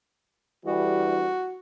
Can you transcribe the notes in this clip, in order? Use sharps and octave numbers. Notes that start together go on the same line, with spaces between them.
D2 E3 G3 F#4